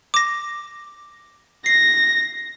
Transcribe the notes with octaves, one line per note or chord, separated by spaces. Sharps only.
D6 A#6
A#6 C7